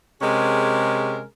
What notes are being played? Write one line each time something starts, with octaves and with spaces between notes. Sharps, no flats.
C3 G#3 C#4 G#4 A#4